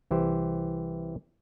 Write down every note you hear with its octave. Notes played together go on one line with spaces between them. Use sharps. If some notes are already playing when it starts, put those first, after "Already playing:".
C2 E3 G4 C5